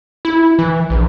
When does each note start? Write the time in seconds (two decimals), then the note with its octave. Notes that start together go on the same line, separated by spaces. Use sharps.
0.25 E4
0.59 E3
0.90 A#1